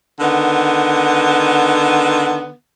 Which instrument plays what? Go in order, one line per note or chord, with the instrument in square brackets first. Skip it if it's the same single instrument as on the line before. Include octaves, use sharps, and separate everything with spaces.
[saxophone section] D3 D#3 B3